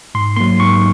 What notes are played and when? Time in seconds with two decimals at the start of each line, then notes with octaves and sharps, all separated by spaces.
0.15 G#2 C6
0.36 F#3 A#3 C6
0.60 G#2 C#6